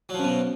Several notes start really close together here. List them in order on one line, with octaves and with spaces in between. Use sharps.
F#3 F3 F#2 B2